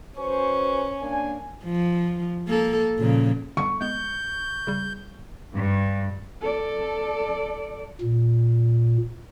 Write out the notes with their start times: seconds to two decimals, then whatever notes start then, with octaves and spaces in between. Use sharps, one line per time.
0.18 C#4 F#4 B4 C5 G#5 C#6
1.01 A#3 D4 G#5
1.64 F3
2.48 A#3 A4
2.98 A#2 C#3 F3
3.57 D3 G3 B3 C#6
3.81 G#3 B3 G6
4.67 C#3 G3
5.52 G2
6.41 A4 D5
8.02 A#2